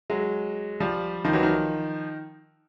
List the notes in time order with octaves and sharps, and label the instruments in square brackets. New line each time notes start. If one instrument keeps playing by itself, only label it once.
[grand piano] F#3 G#3
F3 G3
D#3 F3
E3 F#3
D#3 F3